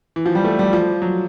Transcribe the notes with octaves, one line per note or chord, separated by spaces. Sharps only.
E3
F3
G3
A3
G3
F3
F#3